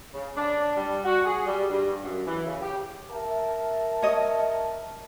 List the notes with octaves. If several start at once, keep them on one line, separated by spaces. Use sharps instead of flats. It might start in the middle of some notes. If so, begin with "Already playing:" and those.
C#3
D4
G3
F#4
G#4
G3
G2
F#2
E3
C#3
G4
A#4 E5 A5
C#5 D#5